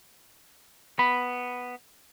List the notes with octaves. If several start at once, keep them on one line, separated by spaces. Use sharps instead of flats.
B3 B5